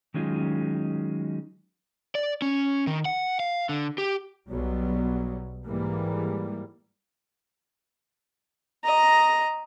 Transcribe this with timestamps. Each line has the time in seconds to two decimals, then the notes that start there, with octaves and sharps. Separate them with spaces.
0.14 D#3 F#3 G#3 C#4 D#4 F4
2.15 D5
2.42 C#4
2.87 D#3
3.05 F#5
3.40 F5
3.69 D3
3.98 G4
4.48 B1 F#3 G3 B3
5.66 G#2 E3 G3 A#3
8.85 D#5 A#5